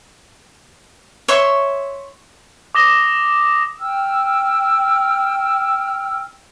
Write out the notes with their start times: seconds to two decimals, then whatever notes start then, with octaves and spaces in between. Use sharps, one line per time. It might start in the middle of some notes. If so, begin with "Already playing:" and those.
1.28 C#5 E5 C6 C#6
2.75 D6 D#6 A#6 E7 G7
3.80 G5 E6 F6